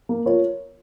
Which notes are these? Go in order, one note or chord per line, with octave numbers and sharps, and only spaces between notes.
A#3
F4 A#4 C#5